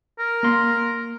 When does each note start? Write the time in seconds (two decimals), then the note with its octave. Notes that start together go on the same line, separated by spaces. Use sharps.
0.19 A#4
0.43 A#3 C6